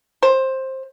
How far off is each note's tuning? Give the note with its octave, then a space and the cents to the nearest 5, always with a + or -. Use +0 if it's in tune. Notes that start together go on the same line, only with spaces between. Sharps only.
C5 +15